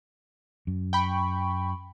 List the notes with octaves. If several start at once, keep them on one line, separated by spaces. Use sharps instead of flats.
F#2
G5 B5 C#6